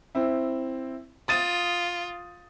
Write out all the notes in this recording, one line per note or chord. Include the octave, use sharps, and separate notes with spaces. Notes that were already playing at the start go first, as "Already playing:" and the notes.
C4 E4
F4 D#6 A6 D#7